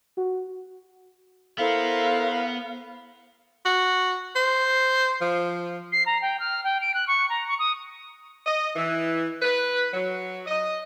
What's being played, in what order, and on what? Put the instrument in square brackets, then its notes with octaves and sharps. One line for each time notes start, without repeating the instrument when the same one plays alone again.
[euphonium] F#4
[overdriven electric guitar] B3 [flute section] E4 A#4 C5 [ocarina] A4 [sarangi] F5
[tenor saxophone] F#4
C5
F3
[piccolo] C7
A#5
G5
F6
G5
D7
F#6
C#6
A#5
C#6
D#6
[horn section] D#5
E3
B4
F#3
D#5